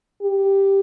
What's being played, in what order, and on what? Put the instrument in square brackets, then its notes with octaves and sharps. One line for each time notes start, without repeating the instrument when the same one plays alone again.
[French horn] G4